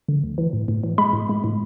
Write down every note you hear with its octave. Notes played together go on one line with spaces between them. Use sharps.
D3
D2
E3
A2
A2
E3
G#3 B5
A2
G#3
A2